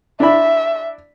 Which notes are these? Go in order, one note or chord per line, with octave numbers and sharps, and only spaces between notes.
D4 E4 E5 B5